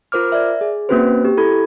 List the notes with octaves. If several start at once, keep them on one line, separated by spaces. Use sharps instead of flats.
F4 A#4 C5 D6 F6
D5 E5
G#4
A#3 C4 C#4 F#4 B4 C5
G4
E4 A4 B5 G#6